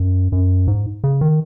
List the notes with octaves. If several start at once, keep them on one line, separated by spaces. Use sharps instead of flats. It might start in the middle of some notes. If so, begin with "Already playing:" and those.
Already playing: F#2
F#2
G#2
C#3
D#3